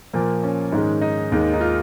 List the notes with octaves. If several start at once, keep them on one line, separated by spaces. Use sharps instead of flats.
A#2 F3 A#3
C#4
G#2 D#3 G#3
D#4
D#2 D#3 G#3
D#4
F4